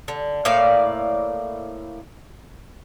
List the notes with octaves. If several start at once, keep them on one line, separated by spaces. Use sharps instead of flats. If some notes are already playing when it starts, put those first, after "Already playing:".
D3
A2 A#3 D5 F5